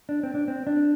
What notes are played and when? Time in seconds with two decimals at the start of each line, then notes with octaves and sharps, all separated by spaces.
0.09 D4
0.23 C4
0.35 D4
0.48 C4
0.67 D4